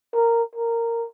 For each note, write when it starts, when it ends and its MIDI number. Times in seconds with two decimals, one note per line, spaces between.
0.14 0.43 70
0.55 1.07 70